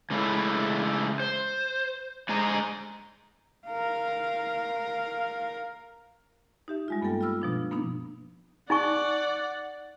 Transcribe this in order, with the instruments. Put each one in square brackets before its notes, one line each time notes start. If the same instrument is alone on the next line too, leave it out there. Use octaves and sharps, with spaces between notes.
[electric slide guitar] C#3 G#3 A3 E4 A4
C5
D3 G#3 G#4 C5 A#5
[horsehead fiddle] A#4 F5
[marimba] D#4 G4 E5
G3 G#3 F4
G2 A#3 B3 A4 G5
F4 B5 E6 F6
B2 F3 D4
A#3 B3 D4 D#4
[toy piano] D#4 G#5 C#6 [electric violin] D5 F#5